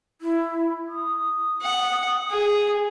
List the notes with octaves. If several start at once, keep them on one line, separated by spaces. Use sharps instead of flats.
E4
D#6
F#5
G#4